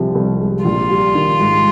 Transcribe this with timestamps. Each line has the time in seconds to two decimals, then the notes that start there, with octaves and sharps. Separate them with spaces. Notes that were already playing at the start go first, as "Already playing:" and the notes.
Already playing: C2 C3 F3 G#3
0.15 C2
0.39 G#3
0.65 A#1 F4
0.90 G3
1.15 D#3
1.41 G#2